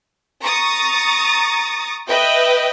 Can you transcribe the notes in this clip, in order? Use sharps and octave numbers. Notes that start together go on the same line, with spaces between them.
A#5 C#6 D#6 A6
B4 D#5 E5 G5